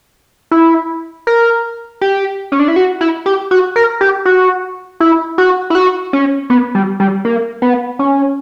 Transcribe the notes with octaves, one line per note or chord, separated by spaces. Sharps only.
E4
A#4
G4
C#4
D4
E4
F#4
E4
G4
F#4
A#4
G4
F#4
E4
F#4
E4
F#4
C#4
B3
G3
G3
A#3
B3
C#4